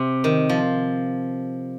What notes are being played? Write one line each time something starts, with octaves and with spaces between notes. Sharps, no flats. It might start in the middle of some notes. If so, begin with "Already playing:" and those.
Already playing: C3
D#3
F3